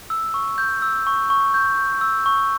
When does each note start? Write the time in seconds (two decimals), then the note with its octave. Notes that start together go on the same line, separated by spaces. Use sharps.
0.10 E6
0.34 C#6
0.58 G6
0.82 E6
1.07 C#6
1.30 C#6
1.54 G6
1.78 G6
2.01 E6
2.26 C#6